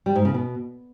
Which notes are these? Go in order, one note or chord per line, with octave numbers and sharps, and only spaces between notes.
G3
G#2
C#3
B2